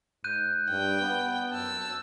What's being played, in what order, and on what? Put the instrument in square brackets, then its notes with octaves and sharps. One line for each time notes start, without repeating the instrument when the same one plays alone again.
[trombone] G#2 [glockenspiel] F#6 G6 D#7
[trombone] G2 [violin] G5
[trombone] B3
[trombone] F#2 [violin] A5 E6